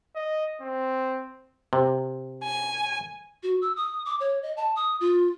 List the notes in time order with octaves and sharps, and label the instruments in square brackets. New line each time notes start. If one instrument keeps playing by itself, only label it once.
[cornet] D#5
C4
[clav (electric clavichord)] C3
[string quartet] G#5
[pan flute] F#4
E6
D#6
D6
C#5
D#5
A5
D#6
F4